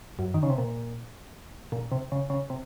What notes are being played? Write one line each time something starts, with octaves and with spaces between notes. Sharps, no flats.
F#2
D#3
C#3
C3
A#2
A#2
C3
C#3
C#3
C3